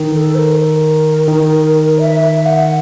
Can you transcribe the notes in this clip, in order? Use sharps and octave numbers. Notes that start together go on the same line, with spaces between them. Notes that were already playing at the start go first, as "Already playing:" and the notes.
Already playing: D#3
A#4
A4
C5
A#4
D#3
E5
E5
F#5